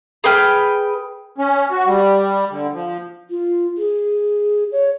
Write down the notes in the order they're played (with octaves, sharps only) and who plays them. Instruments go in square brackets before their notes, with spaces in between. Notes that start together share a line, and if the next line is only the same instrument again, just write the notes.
[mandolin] G#4 B4 G5 F6
[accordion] C#4
F#4
G3
D3
F3
[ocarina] F4
G#4
C#5